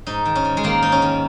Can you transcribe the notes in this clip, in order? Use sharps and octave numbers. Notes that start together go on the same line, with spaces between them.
G#2 D#4
D#3
C#4
G#2
G#3
D#3 A#3
G#2 D#4
C#4
D#3